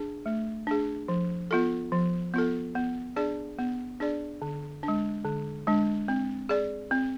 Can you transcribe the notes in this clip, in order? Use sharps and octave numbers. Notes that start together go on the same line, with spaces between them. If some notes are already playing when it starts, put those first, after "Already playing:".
Already playing: D4 G#4
A3
D4 G#4
F3
B3 F4 A4
F3
B3 F4 A4
B3
D4 G#4 D5
B3
D4 G#4 D5
D3
D4
G#3
D3
G#3 D4
C4
G#4 D5
C4